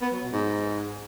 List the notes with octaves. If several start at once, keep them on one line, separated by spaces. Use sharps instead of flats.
B3
F#3
B2
G#2